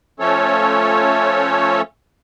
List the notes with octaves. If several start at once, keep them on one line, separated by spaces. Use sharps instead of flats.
F3 A3 C#4 A4 C#5